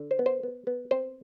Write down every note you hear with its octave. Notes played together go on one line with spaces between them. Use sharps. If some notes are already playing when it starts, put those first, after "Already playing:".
Already playing: D3
C5
B3
C5
B3
B3
C4 C5